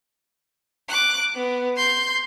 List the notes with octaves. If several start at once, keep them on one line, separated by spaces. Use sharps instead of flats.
D6 F#6
B3
C6 G6